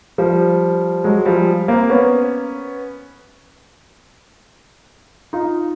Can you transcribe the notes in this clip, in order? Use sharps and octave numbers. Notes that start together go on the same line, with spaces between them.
F3 G3
F#3 G#3
F3 G3
A#3 C4
B3 C#4
D#4 F4